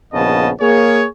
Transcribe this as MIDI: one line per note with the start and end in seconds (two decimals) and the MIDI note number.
0.13 0.50 34
0.13 0.50 39
0.13 0.50 49
0.13 0.50 59
0.13 0.50 75
0.13 0.50 81
0.61 1.06 58
0.61 1.06 68
0.61 1.06 73